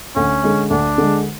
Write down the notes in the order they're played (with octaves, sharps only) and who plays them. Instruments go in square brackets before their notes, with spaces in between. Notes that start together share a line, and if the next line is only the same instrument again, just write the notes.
[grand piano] D2 [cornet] C#4
[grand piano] D3 G#3
[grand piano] D2 [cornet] D4
[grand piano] D3 G#3